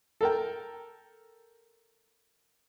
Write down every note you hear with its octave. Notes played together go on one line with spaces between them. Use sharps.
A4 A#4 G5